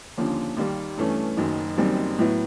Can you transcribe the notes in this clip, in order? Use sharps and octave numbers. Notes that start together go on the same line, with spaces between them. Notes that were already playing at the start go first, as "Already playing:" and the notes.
D#2 D3 F3 A#3 C#4
D#2 D#3 G3 A#3
G2 E3 A3 C#4
F#1 F#2 D#3
F#1 F#2 D#3 G3 C4
A2 F#3 B3 E4